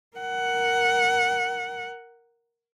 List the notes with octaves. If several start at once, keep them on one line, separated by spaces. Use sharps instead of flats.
A#4 F#5